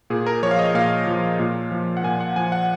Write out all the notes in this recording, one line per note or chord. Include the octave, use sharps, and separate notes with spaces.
A#2 G#4
A#4
F3 C#5
F5
D#5
A#2 F5
F3
A#2
F3
F#5
A#2 G#5
F#5
F3 G#5
F#5